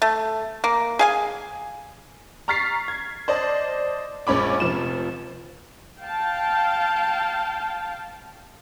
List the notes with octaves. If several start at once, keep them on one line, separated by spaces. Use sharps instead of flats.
A3
A#3
G#4 F5 G#5
A#5 C#6 F6 A6 B6 C7
G#6
C5 D5 D#5 A5
A#1 G#3 C#4 B5 D6
F1 F3 E7
F5 G5 A5